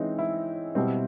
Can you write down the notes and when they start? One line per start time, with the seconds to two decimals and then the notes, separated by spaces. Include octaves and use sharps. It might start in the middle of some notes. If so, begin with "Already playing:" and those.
Already playing: E3 G#3 C4 C#4 D#4
0.18 E4
0.75 B2 G3 C4